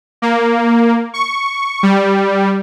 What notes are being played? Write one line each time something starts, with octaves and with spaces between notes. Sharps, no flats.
A#3
C#6
G3